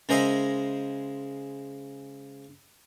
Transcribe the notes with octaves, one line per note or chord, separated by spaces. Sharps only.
C#3 G#3 A#4 C5 D#5 E5